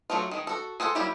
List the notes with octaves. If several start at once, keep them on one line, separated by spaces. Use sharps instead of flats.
F#3 A3 D4 F4
D#3 G#3
F#4 A4
G#4 A4 C5 F#5
F#3 G3 A#3 E4 G4